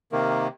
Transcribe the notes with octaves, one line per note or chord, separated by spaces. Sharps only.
C3 D#3 A#3